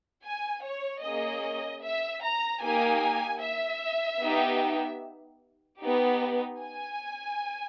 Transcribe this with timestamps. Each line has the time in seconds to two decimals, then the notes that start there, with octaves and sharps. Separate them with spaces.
0.24 G#5
0.63 C#5
1.02 A#3 C#4 G#4 D#5
1.82 E5
2.22 A#5
2.61 A#3 D#4 G4 G#5
3.41 E5
4.21 B3 D#4 G4
5.79 B3 D#4 G4
6.59 G#5